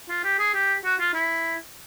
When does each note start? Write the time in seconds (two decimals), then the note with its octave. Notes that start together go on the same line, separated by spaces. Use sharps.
0.09 F4
0.24 G4
0.39 G#4
0.54 G4
0.84 F#4
1.00 F4
1.14 E4